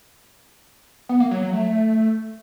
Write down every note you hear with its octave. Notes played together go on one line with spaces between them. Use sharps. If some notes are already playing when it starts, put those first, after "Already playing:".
B3
A#3
F#3
F#3
A3